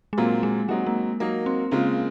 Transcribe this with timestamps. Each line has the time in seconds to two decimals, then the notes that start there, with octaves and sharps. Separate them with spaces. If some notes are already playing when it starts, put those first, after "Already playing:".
0.13 G#3
0.17 A#2 F#3 A#3 C4 F4
0.43 G#3
0.68 F#3 G#3 C4 D#4 F#4
0.86 A#3
1.20 F#3 A#3 D#4 A#4
1.46 C4
1.71 C#3 G#3 A#3 C4 F4